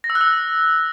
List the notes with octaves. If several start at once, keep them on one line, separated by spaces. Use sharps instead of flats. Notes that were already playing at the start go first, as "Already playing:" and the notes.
A#6
E6
F#6
E6